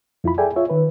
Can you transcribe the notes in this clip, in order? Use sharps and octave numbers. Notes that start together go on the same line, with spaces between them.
F2 E4 F4 B5
G#4 A4 D5 E5 G5 G#5
F4 C#5 E5
D#3 B4